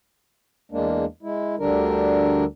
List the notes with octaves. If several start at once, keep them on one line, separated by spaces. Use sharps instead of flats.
E2 G#3 A#3 D4
G#3 E4
D2 D3 G3 D4 A#4